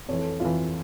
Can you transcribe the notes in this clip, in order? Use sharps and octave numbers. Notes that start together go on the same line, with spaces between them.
F2 E3 C#5
A4
F2 E3 F4